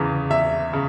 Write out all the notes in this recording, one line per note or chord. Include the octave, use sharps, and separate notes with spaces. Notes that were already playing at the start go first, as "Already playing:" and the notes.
Already playing: E2 C#3 E3
E2 E5
C#3